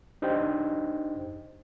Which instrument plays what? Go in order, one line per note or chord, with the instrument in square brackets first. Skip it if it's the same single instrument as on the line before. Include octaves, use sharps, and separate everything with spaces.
[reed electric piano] D4 D#4 G4 C5 D#5 G5